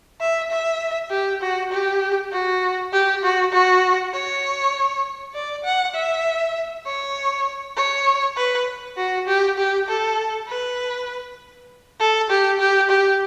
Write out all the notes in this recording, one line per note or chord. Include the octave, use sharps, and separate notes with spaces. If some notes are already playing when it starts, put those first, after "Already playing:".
E5
E5
G4
F#4
G4
F#4
G4
F#4
F#4
C#5
D5
F#5
E5
C#5
C#5
B4
F#4
G4
G4
A4
B4
A4
G4
G4
G4